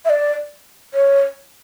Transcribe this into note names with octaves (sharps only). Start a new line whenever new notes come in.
E5
D5
C#5